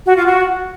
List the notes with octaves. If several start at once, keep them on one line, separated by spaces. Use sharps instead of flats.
F#4
F4
F#4